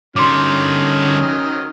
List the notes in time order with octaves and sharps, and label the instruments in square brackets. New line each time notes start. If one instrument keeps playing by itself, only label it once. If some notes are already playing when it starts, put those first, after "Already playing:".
[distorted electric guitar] D3 G3 [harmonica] D#3 F#3 F6 [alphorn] C#4 [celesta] C6 D6